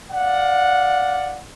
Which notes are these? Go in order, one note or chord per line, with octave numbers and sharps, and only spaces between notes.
D5 F5 F#5